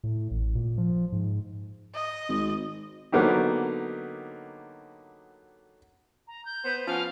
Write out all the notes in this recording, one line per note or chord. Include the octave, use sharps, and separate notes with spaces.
A2
A1
A#2
F3
G#2
D#5
G#1
D3 F#3 A#3 B3 D#4 G4
A#5
G6
B3 C5
F3 B3 C#4 F5